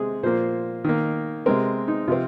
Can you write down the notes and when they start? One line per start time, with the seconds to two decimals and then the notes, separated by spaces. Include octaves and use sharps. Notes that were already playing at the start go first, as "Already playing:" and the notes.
Already playing: C3 G#3 C4 G#4
0.23 A#2 F3 A#3 C5
0.84 D#3 A#3
1.46 C3 G#3 C4 A#4
1.88 D#4
2.08 C3 F3 C4 F4